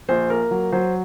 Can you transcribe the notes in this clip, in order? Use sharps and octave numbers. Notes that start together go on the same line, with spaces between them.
A#1 C5
A#3 A#4
F#3
F#3 C5